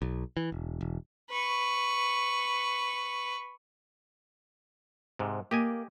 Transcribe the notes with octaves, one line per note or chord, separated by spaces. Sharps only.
B1
E3
E1
E1
B4 C#6
G#2 C3
A#3 G4 D#5 G#5